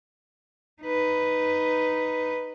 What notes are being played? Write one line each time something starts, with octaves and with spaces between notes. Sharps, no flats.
D#4 B4